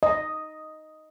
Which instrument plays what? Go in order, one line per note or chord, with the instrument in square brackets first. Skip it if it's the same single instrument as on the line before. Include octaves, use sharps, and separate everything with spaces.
[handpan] D#5